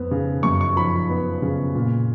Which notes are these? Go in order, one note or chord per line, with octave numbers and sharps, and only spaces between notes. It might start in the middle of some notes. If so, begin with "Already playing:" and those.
Already playing: F2 B3
C#3
F#2 C#6
C#6
F3 B5
B3
C#3
A#2